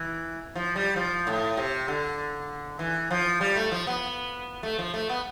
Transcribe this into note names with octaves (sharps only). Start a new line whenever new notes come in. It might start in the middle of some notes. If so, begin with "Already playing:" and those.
Already playing: E3
F3
G3
F3
A2
C3
D3
E3
F3
G3
A3
F3
B3
A3
F3
A3
B3